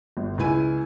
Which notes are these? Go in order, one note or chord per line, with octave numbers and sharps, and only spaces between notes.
G1
C#2 B3 E4 G#5 D#7